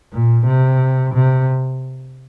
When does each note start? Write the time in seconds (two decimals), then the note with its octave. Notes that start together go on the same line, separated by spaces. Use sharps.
0.13 A#2
0.46 C3
1.14 C3